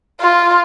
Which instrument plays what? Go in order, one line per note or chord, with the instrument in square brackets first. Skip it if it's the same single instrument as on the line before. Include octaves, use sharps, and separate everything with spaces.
[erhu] F4